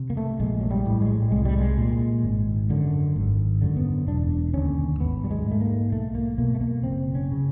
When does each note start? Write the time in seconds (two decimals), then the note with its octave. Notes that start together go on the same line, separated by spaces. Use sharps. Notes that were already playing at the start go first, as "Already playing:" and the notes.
Already playing: C3
0.10 A#3
0.17 A3
0.40 A#1 G#3
0.61 F#3
0.71 G3
0.86 A2
1.01 G#3
1.31 C2 G#3
1.45 G3
1.59 G#3
1.78 A#2
2.23 G#1
2.70 F#2 D3
3.16 G#1
3.62 F#2 D3
3.77 B3
4.07 E1 D4
4.53 D#2 D3 C#4
5.00 G#1 B3
5.24 G3
5.31 G#3
5.46 G#2
5.51 A3
5.61 A#3
5.92 B1 A3
6.15 A#3
6.38 B2 A#3
6.55 A3
6.61 A#3
6.83 F#1 C4
7.15 C#4
7.32 C#3